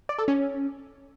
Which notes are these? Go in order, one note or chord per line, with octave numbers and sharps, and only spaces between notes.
D5
A4
C#4